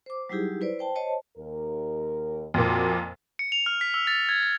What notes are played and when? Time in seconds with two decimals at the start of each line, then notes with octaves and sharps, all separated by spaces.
0.06 C5 D6
0.29 F#3 G3 D#4 E4 G4 G#4
0.61 E4 B4 C5 D5
0.79 C5 G5 A5
0.95 C5 C#5 D#5 A5
1.37 D#2 A#4
2.54 F2 A#2 F#4
3.39 C#7
3.52 F7
3.66 F6
3.81 B6
3.94 E6
4.07 A6
4.29 G#6
4.43 A6